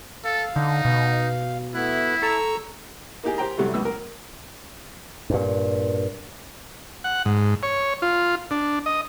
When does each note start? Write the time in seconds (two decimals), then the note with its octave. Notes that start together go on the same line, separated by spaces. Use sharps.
0.24 A4 F5
0.56 D3 D#4
0.85 B2
1.75 A3 B3 E4 F#6
2.22 A4 A#5 C#6 E6
3.24 A#3 D#4 G4 G#4
3.38 G4 C5 G5 A#5
3.58 G2 C3 F#3 G3 A3
3.74 C#2 F#2 B3 E6
3.85 A#4
5.30 G2 A#2
7.04 F#5
7.25 G#2
7.63 C#5
8.02 F4
8.51 D4
8.86 D#5